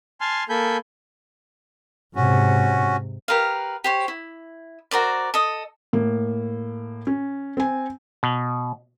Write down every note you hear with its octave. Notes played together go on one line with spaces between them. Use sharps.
G#5 A5 C6 F6
A#3 A4 G#5 B5 G6
G#2 C3 C#4 F#4
G4 A#4 B4 F5
G4 C5 C#5
E4
F#4 A#4 C5 D5
A4 D#5
A2 A#3
C#4
C4 G#5
B2